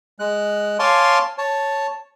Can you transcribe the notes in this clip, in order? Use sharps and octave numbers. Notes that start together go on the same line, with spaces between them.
G#3 F#6
C#5 F5 G#5 A5 C6 D6
C#5 A5